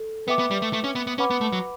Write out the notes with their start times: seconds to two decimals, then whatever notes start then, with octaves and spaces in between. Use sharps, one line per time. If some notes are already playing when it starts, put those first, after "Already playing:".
Already playing: A4
0.27 B3 B4 E5 G5 D6
0.39 B3
0.51 G3
0.62 A3
0.73 A3
0.84 C#4
0.95 B3
1.07 B3
1.18 C#4 B4 F#5 B5 D6
1.30 B3
1.41 A3
1.52 F#3